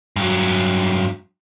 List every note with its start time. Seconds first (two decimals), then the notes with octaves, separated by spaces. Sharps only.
0.16 G2 F#3